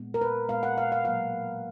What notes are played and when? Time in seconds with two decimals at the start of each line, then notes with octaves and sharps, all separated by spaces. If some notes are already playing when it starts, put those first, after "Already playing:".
Already playing: A#2 G#3 B3
0.14 A#4
0.21 B4
0.48 A#2 G#3 B3 F5
0.63 F#5
0.78 F5
0.92 F5
1.05 B2 F#3 A#3 F5